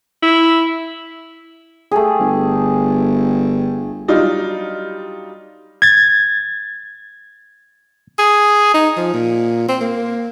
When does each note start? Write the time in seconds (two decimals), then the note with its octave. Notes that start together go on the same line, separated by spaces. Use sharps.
0.23 E4
1.91 A3 G4 G#4
2.19 G1
4.08 F#3 G3 D4 D#4 F4
5.82 G#6 A6
8.19 G#4
8.74 D#4
8.97 F3
9.14 A#2
9.69 C4
9.81 A#3